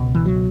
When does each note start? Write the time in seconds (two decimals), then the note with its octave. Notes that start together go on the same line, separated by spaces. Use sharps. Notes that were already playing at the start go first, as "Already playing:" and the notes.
Already playing: C#2 B2
0.15 E3
0.26 F#3